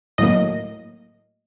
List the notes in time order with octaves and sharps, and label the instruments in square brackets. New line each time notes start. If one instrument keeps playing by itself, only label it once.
[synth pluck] A2 F#3 A#3 D#5